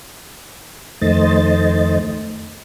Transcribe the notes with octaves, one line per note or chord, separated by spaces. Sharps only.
F2 D#3 A3 C5 D#5 A6